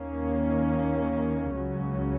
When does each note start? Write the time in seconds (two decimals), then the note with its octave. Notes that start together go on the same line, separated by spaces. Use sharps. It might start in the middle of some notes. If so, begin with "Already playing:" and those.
Already playing: D#2 D#3 A#3 C#4
1.56 C#2 C#3 F#3 C#4